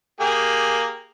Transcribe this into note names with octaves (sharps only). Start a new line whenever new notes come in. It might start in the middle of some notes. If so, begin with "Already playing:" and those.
A#3 G4 G#4